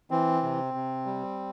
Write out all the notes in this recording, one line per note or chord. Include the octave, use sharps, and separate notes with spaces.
E3 C4
C3
C3
G3